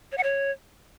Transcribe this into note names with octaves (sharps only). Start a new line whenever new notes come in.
C#5
F#5
C#5